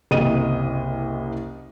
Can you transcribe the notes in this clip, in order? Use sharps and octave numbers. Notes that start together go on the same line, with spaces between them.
F#1 C2 D#5 D#7